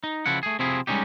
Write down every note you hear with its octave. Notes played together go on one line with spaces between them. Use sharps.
D#4
C#3 F3 E4 F#5
A3 G#4
C3 F3 C4 E4 G#4
G3 G#3 A#3 C#4 D#4 G4